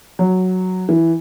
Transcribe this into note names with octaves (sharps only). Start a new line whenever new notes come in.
F#3
E3